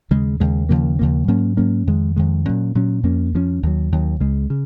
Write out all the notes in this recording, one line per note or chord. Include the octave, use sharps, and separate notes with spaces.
D#2 C#3 G#3
D#2 C#3 G#3
D#2 C#3 F3 A#3
D#2 C#3 F3 A#3
G#2 F#3 A#3 C#4
G#2 F#3 A#3 C#4
F2 D#3 G#3
F2 D#3 G#3
A#2 F#3 C#4
A#2 F#3 C#4
F2 F3 A#3 C#4
F2 F3 A#3 C#4
D#2 D#3 F#3
D#2 D#3 F#3
C#2 C#3 G#3
C#3